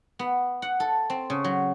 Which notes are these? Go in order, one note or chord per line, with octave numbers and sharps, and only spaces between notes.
B3
F#5
A4
C4
C#3
F#3